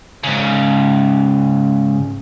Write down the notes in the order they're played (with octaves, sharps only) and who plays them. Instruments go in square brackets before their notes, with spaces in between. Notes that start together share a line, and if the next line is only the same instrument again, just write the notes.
[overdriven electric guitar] G#2 C#3